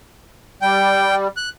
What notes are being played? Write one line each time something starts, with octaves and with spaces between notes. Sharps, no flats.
G3 G5
F#6